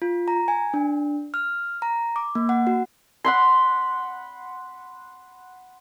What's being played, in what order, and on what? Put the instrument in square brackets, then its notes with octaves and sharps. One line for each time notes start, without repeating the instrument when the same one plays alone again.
[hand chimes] F4
A#5
G#5
D4
F6
A#5
D6
A#3
F#5
F#4
[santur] F#5 B5 C6